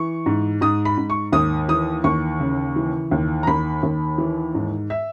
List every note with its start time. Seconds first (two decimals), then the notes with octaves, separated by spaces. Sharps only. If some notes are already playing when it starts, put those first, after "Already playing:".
Already playing: E3 C#6
0.26 G#2
0.61 G#2 D#6
0.85 B5
0.97 G#2
1.10 C#6
1.33 D#2 D#6
1.68 E3 D#6
2.04 D#2 C#6
2.40 C#3
2.76 E3
3.11 D#2
3.43 A#5
3.47 D#2 B5
3.83 D#2
4.18 E3
4.55 G#2
4.90 E5